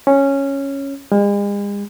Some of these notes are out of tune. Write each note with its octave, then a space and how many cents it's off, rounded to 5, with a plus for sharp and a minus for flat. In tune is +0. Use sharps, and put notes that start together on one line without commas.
C#4 -5
G#3 -40